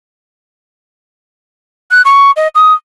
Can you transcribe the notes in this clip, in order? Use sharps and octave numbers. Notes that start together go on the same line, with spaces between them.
F#6
C#6
D#5
D#6